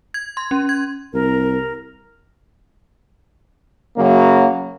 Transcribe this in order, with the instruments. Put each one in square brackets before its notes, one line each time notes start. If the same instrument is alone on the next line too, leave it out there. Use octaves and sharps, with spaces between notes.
[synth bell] G#6
C6
C#4
G#6
[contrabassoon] C2 [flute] A#4
[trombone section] F#2 C#3 F#3 A#3